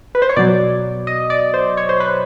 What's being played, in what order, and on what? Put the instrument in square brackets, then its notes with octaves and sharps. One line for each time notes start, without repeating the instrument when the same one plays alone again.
[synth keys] B4
C5
C#5
B2 F#3 D5
D#5
D5
C5
C#5
C5
B4